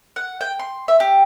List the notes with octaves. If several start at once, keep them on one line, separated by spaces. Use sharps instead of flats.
F#5
G5
C6
E5
G4